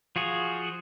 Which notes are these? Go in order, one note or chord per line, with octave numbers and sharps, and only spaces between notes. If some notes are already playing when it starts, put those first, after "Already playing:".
F3 F4 F#4 G#4